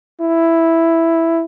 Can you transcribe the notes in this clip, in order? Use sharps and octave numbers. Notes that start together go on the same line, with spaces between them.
E4